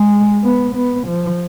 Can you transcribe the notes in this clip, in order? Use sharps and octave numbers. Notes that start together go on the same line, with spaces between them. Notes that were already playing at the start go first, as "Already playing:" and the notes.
Already playing: G#3
B3
B3
F3